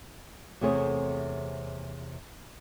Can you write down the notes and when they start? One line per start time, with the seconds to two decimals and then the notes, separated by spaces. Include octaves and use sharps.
0.61 E2 C3 A3 C4 G#4 C#5